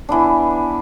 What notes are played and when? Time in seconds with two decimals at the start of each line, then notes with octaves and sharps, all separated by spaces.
0.09 E3 B3 D4